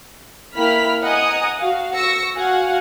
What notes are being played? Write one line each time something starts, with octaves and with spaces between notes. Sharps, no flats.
A#3 E4 G5 B5 F6 B6
D#5 F#5 G#5 A#5 D#6
F#4 F5
C#6 E6 A#6 C#7
F#4 F5 F#5 G#5